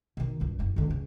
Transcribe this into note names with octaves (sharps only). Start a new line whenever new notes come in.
B2 D#3
C#2 G2
F#1 A2
C#2 D3
G2 C#3